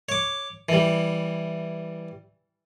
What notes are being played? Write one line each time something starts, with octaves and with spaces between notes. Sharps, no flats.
C#5 D6
E3 G3